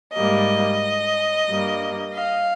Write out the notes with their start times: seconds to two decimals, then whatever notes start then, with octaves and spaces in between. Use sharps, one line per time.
0.14 G#2 G3 A#3 D#5
1.48 G2 G3 A#3
2.15 F5